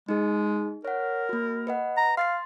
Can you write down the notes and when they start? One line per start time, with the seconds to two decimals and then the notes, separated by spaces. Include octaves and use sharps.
0.09 G#3 D#4 G#4
0.85 A#4 C#5 F#5
1.29 A#3 F#4
1.67 B4 D#5 F#5
1.97 A#5
2.17 F5 C6 A6 C7